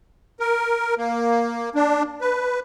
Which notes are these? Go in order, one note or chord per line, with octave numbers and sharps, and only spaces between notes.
A#4
A#3
D4
B4